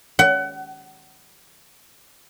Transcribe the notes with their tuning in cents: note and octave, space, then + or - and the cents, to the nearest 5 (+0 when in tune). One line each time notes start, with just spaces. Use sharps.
F#5 +30